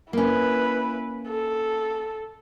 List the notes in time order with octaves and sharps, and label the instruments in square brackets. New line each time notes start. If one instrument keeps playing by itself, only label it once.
[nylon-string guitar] A#3 C#4 [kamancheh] E4 B4
[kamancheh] A4